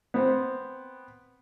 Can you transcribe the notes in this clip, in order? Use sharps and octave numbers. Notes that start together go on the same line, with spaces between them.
B3 C4